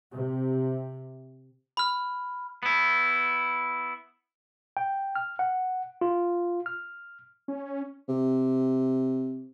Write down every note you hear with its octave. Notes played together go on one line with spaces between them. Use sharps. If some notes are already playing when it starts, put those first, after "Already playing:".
C3
B5 F6
B3 E4
G5
F6
F#5
F4
F6
C#4
C3